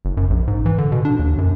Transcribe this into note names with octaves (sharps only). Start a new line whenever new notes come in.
F#1
F#2
A#1
G#2
E3
D3
B2
D4
D#2
F#2